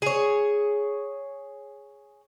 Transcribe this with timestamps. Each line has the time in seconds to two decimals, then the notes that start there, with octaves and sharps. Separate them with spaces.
0.02 G#4 C#5